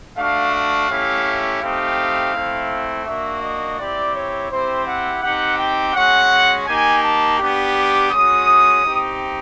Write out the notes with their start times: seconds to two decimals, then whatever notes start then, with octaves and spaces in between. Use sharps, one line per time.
0.17 A3 D4 F#4 F5
0.53 F5
0.89 A3 C#4 E4 G4
1.61 A3 C4 D#4 G4 F5
2.33 A3 C4 E4
3.05 A#3 D4 F#4 E5
3.42 D#5
3.78 C4 E4 G4 D5
4.14 C#5
4.50 C4 E4 G4 C5
4.86 F#5
5.22 C4 D#4 G4 F#5
5.58 G5
5.94 G#3 C#4 F#4 F#5
6.66 A#3 D#4 G4 G#5
7.02 A5
7.38 B3 D4 G4
7.75 D6
8.11 G#3 C#4 F#4 D#6
8.83 C4 D#4 G4